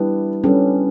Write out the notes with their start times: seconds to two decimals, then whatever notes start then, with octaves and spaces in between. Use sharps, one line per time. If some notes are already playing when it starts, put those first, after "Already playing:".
Already playing: G3 B3 D4 E4
0.44 G3 B3 C#4 D4 A4